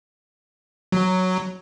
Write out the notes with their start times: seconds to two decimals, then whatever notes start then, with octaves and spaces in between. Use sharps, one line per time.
0.92 F#3